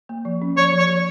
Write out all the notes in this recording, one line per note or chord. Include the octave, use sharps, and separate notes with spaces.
A#3
F3
C#4
F3 C#5
F3
C#5
F3